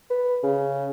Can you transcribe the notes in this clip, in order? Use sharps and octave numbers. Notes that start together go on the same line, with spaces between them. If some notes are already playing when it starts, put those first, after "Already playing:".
B4
C#3